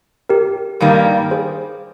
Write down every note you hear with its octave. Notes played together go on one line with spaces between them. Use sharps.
G4 A#4
G2 D#3 G3 A#3
G#4 C5